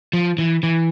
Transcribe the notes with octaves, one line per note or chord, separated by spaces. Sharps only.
F3
E3
E3